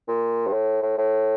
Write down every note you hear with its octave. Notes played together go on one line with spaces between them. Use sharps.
A#2
G2
A2
A2
A2